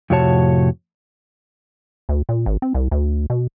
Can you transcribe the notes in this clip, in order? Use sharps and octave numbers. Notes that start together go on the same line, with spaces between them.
F2 A2 C3 F#4 C#5 A5
D2
A#2
G#1
C4
C2
D2
B2